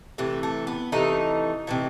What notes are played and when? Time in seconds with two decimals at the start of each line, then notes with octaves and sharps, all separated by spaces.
0.18 C3 E3 A3
0.43 A3
0.67 B3
0.92 C3 E3 A3 D#4
1.67 C3 E3 A3